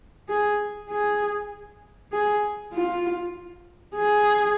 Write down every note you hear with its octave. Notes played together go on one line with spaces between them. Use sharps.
G#4
G#4
G#4
F4
G#4